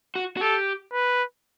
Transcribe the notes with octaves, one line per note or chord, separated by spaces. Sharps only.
F#4
F#4
G4 A4
B4